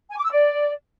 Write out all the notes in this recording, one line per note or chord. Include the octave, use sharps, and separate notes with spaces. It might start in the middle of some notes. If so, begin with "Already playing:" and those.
G#5
D6
E6
D5